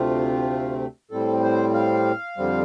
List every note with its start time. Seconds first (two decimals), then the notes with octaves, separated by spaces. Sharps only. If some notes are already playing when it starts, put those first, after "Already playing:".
Already playing: D2 C3 A3 C4 F4
1.11 A2 G3 C4 A4
1.43 C5
1.74 F5
2.37 F2 D3 G3 C4